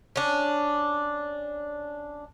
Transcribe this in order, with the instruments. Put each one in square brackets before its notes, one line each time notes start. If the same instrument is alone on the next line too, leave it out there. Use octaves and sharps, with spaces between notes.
[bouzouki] C#4 D4